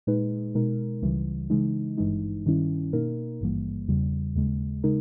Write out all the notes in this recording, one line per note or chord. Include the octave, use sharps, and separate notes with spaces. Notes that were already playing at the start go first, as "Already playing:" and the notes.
A#2 G#3 D#4 G#4 B4
B2 G#3 D#4 A#4
C#2 C#3 E3 G3
C#3 E3 G#3 D#4
G#1 G2 E3 G#3 D#4
G2 D#3 G3 C#4 E4
B2 A#3 D#4 A#4
G#1 G2 E3 G3 A#3
E2 C#3 G3
D#2 C#3 G#3
C#3 G#3 D#4 A#4